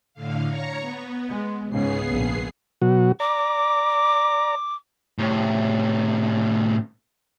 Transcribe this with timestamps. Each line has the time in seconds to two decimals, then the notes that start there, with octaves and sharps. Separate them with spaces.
0.14 A2 D3 F5
0.48 C#5 A#5 C#6
0.80 B3
1.30 G#3
1.70 C#2 G#2 C#3 B3 G#4 C7
2.10 A#1
2.82 B2 F#3 F#4
3.20 D5 A#5 D6
5.19 A2 C3